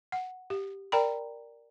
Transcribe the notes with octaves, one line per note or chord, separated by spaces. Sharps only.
F#5
G4
A#4 D5 G5 A#5 B5